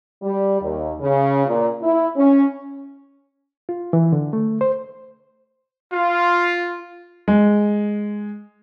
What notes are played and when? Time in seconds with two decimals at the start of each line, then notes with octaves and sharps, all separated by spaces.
0.23 G3
0.61 D#2
1.00 C#3
1.47 A#2
1.82 E4
2.16 C#4
3.69 F4
3.93 E3
4.13 D3
4.33 A3
4.61 C5
5.92 F4
7.28 G#3